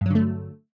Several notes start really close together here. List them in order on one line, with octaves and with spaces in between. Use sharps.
G2 F#3 D3 A3